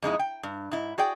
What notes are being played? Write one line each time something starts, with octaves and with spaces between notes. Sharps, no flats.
F2 G#3 D#4 E4
G5
G2
G#2 E4
F#4 G#4 D5 G5